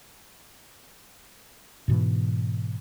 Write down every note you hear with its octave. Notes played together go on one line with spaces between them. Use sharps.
G#2 B2 E3